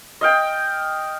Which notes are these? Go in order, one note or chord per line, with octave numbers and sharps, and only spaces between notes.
D#5 F5 G5